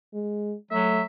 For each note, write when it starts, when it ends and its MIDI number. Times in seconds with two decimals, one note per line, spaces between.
0.14 0.55 56
0.71 1.02 54
0.71 1.02 57
0.71 1.03 76